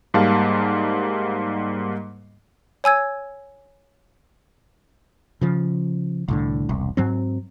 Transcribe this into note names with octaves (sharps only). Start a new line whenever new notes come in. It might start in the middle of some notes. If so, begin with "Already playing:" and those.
G#2 G3 A#3 F5 A5
C#5 G#5 E6 G#6
C#3 F3
C2 A2 D3
E1 C2
G#2 F#3 C4